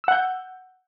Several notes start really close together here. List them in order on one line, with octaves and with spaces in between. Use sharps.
E6 F#5 G6